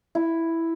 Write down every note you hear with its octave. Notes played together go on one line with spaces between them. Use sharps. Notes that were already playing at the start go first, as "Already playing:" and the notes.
E4